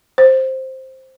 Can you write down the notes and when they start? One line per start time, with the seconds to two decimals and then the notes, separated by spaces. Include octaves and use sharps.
0.18 C5